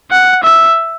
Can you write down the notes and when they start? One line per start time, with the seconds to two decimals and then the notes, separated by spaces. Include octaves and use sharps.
0.11 F#5
0.43 E5